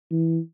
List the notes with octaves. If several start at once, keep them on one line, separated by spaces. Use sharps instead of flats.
E3